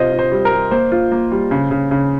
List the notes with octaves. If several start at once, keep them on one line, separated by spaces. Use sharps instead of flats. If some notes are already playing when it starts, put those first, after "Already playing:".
Already playing: C3 F4 C5 D#5
F4
C5
G3
A#4
G3
A#3 C5
F4
A#3
G3
C#3
C#3
C#3